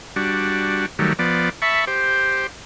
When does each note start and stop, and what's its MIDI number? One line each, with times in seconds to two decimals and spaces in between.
0.16 0.86 55
0.16 0.86 62
0.16 0.86 66
0.99 1.13 51
0.99 1.13 54
0.99 1.13 55
0.99 1.13 57
1.19 1.49 53
1.19 1.49 59
1.19 1.49 74
1.62 1.85 76
1.62 1.85 81
1.62 1.85 83
1.62 1.85 85
1.87 2.47 67
1.87 2.47 72